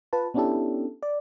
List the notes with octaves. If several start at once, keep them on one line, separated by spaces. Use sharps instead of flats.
F4 B4 A5
B3 C#4 D4 E4 G4 A4
D5